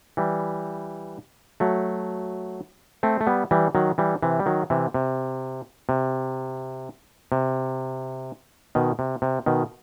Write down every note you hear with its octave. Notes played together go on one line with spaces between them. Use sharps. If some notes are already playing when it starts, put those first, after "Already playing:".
E3 G3
F#3 A3
A3 C4
A3
G3 B3
E3 G3
D#3 F#3
E3 G3
C3 E3
G3
D#3 F#3
C3 E3
C3
C3
C3
B2 D#3
C3
C3
B2 D#3